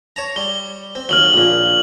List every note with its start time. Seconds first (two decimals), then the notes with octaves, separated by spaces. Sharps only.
0.16 C#5 A5 A#5
0.36 G3 G7
0.95 C4
1.09 D#2 F#3 F6 F#7 G7
1.34 A#1 A#2